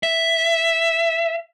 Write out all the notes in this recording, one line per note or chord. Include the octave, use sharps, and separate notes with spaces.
E5